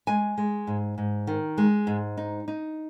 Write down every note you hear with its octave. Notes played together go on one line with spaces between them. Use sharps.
G#3 G#5
G#3
G#2
G#2
D#3
G#3
G#2
D#4
D#4